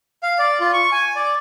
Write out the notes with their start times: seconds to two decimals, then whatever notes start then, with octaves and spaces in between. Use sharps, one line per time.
0.23 F5
0.39 D5
0.60 F4
0.73 C#6
0.92 G#5
1.16 D5